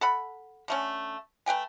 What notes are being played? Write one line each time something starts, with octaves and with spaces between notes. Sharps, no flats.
A4 F#5 B5
D3 A3 C#4
A3 B4 G5 G#5